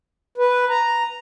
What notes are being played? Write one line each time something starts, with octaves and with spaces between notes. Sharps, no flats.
B4
A#5